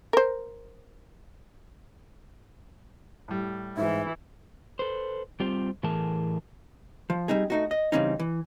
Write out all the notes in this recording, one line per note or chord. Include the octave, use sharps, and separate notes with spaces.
A#4 C5
A2 G3
G#2 E3 E4 E5
A4 B4 C5
G3 C4 F4 G4 C5
A2 E3 A3 G#4 A#4 A5
F3
G3 C4 D#4 G#4
A3 D#4 F#4
D#5
C#3 E3 G3 C4 C#4 D#4
E3